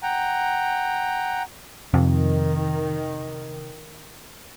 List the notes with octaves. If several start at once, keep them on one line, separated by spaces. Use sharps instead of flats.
F#5 G5 A#5
F2 C3 D#3